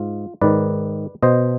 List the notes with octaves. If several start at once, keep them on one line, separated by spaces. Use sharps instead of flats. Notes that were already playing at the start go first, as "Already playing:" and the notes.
Already playing: G#2 F4
G#2 D#3 B4 D5
B2 C5 D#5